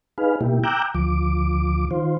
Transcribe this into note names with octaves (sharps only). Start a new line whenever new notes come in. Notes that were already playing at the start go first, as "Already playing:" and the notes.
D#4 G#4 B4 F5
B2 A#3 E4 G4
G5 A#5 D6 E6 F#6 G6
D2 F3 D6
D#3 F4 C5